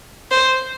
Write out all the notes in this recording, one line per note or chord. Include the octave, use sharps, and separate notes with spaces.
C5